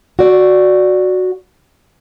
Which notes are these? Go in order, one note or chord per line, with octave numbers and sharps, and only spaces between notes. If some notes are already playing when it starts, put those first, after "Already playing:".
F#4 D5